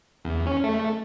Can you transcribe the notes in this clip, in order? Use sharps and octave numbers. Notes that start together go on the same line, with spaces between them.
E2
C#4
A3